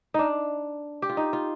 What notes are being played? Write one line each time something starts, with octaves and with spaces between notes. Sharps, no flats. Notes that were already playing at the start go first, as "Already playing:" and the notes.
D4 D#4
G4
F4
D#4
F4